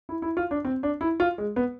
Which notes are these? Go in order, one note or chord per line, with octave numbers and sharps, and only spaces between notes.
E4
E4
F4
D4
C4
D4
E4
F4
G#3
B3